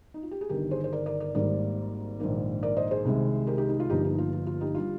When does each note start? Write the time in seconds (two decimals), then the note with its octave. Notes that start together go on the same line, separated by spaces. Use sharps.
0.14 D#4
0.23 F4
0.31 G4
0.41 G#4
0.49 G1 G2 D#3 G4 A#4
0.71 G#4 C5
0.84 C5
0.92 A#4 D5
1.06 A#4 D5
1.20 A#4 D5
1.35 G#1 G#2 G3 A#3 A#4 D5
2.20 A#1 G#2 D#3 A#3
2.63 A#4 D5
2.77 C5 D#5
2.91 G#4 C5
3.05 C2 C3 D#3 G#3
3.47 G4 A#4
3.58 D#4 G4
3.69 D#4
3.80 F4
3.89 G1 G2 F3 A#3 D#4 G4
4.04 D#4
4.18 F4
4.33 F4
4.47 F4
4.61 D#4 G4
4.75 D3 G3 F4